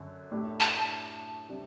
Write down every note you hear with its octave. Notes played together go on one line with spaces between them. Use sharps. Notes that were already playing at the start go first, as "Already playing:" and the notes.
Already playing: F#2 D3
A2 A3 D4 G4
A5
C3 G3 D4